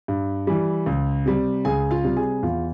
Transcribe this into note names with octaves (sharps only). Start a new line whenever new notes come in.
G2
E3 G3
C#2
C3 G3
C#2 G#4 G#5
F4 F5
C3 G3
G#4 G#5
E2 F4 F5